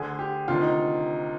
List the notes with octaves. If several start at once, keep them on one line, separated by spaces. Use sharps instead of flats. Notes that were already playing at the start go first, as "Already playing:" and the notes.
Already playing: D2 D3 G#4
G4
D2 C3 D#3 F4
D#4